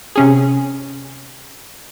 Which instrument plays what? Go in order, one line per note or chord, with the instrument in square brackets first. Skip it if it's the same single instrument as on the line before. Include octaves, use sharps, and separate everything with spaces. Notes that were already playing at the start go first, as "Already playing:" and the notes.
[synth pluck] C3 C#4 G#4